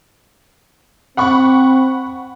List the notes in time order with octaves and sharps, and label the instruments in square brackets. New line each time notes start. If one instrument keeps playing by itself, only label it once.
[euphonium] C4 [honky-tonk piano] F#5 B5 C#6